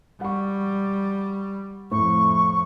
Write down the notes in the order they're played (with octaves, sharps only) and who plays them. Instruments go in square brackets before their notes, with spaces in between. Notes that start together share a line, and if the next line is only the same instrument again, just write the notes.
[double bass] G3 [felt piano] F#5 C#6
[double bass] F2 [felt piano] A2 [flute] C#6